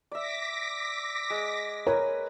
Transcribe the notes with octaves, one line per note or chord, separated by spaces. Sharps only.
D5 E5 D6 A#6 B6
G#3
A#4 B4 C#5 G#5